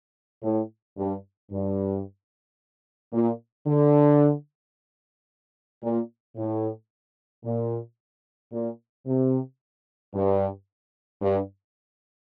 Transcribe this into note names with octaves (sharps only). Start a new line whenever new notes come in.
A2
G2
G2
A#2
D3
A#2
A2
A#2
A#2
C3
G2
G2